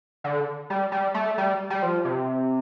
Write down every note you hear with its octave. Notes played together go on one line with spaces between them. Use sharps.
D3
G3
G3
A3
G3
G3
F3
C3